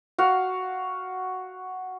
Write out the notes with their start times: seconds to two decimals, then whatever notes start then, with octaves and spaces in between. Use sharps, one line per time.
0.18 F#4 F5